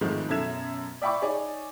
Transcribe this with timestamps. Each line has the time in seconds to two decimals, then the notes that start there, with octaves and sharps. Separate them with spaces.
0.01 F2 G#2 D#3 F3 G#3 A3
0.28 F#2 B2 A4 E5 G#6 E7
1.02 D5 E5 G5 B5 C#6 D6
1.22 D#4 G#4 C#5 D5